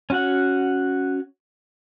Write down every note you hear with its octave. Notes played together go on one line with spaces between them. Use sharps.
C#4 F#4 F#5